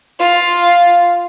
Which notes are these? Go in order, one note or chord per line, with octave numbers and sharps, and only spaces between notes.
F4